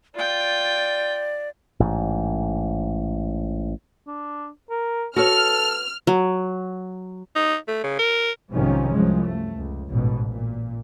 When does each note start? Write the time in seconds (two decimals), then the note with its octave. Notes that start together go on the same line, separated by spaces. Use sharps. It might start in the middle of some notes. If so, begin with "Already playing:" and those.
0.15 F4 D5 G5
1.80 A1 G#2
4.07 D4
4.70 A#4
5.16 F#4 A4 B4 C#5 F6
6.07 F#3
7.36 D#4
7.68 A3
7.84 C#3
7.99 A#4
8.51 B1 G#2 C3 D#3 F3 C#4
8.93 C2 F#2 F3 G#3
9.27 A3
9.56 C#2
9.89 A1 G#2 B2
10.31 A#2